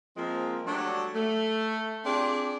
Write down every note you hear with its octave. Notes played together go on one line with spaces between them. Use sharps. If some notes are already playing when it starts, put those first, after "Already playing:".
F3 G#3 A#3 C4
F#3 G3 A3 D4
A3
C4 D4 F4 G4 G#4